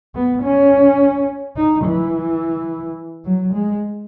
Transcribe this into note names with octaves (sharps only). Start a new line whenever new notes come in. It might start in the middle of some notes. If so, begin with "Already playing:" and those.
B3
C#4
D#4
E3
F#3
G#3